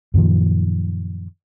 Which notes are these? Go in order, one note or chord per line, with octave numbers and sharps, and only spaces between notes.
F#2 A#2 D#3 F3